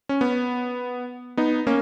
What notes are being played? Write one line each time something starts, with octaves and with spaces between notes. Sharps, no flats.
C#4
B3
B3 D#4
A#3 C#4